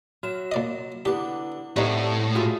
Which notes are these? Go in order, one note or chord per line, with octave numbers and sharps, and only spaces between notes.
F#3 F#4 E7
A#2 D5 D#5
D3 B3 E4 G4 D6
A2 A3 B3 C4 D#4 G4 C#5 D5
A3 F4 F#4 G#4